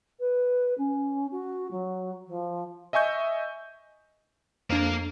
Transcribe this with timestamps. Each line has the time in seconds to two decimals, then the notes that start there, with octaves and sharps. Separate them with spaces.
0.19 B4
0.77 C#4
1.31 F#4
1.70 F#3
2.27 F3
2.93 D#5 E5 G#5 C#6 G6
4.70 F2 A#3 D4 F5